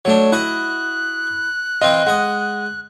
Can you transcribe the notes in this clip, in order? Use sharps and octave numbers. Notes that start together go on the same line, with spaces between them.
F#3 A3 D4 C#5
E4 F#4 D#5 F#5 F#6
E3 C4 F4 D#5
G#3 D#5 F#5